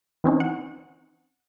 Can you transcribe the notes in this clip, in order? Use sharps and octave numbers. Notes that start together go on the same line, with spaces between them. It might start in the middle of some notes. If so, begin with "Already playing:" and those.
E3 C4 C#4 D#4
F#5